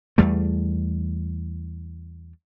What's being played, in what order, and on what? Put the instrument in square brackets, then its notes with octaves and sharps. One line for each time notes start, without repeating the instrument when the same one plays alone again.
[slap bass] E2 G3 A3